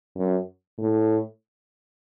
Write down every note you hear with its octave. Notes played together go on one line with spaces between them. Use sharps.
F#2
A2